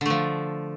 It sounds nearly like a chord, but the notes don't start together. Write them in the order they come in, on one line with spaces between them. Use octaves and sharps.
D3 A3 F3